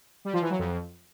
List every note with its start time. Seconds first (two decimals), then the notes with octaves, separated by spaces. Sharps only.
0.25 G3
0.33 F3
0.42 E3
0.50 F#3
0.59 F2